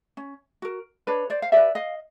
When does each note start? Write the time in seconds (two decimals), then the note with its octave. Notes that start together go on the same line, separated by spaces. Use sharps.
0.17 C#4
0.62 F#4 A#4
1.07 D4 B4 C#5
1.30 C5 D5
1.42 F5
1.52 G4 B4 D5 E5
1.75 D#5 F5